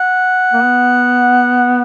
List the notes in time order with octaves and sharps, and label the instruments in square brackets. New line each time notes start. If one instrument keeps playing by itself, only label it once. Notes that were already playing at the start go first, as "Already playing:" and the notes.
Already playing: [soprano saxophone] F#5
[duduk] A#3
B3